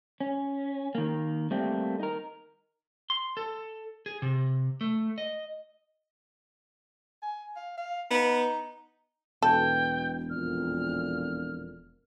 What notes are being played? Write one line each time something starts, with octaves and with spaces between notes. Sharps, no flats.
C#4
D#3 A#3
G3 A3 A#3 C4
D#4 A#4
C6
A4
G#4
C3
A3
D#5
G#5
F5
F5
B3 D#4
E1 B2 A4 G5
F2 A#2 F6